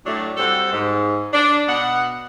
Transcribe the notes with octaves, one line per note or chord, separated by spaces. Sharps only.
A2 F#3 A3 D4
G3 C4 F#4 A4
G#2
D4
B2 D#5 F#5